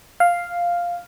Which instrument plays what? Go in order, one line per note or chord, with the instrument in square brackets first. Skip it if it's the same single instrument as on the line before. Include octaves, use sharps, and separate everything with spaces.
[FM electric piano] F5